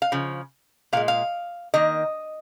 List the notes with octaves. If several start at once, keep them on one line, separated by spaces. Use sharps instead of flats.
F5
C#3 F3
A#2 G#3 F5
F5
D#3 A#3 D#5